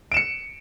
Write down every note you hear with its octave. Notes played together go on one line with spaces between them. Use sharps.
C#7 D7 E7